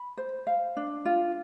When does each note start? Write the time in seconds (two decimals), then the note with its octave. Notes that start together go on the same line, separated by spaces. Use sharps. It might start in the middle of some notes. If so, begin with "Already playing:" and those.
Already playing: B5
0.17 C5
0.47 F5
0.77 D4
1.05 F4